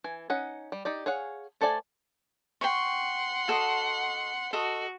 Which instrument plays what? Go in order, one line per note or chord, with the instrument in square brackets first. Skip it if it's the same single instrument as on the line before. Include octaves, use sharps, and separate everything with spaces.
[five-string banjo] E3 G#5
C#4 D#4 F#5
G3
D#4 G4 D5
G#4 C#5 F5 F#5
A3 A4 C5 D5 G#5
[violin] F#5 C6 [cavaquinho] G5 C#6
[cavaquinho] F#4 A4 D#5
[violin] F#4 [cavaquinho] A4 D#5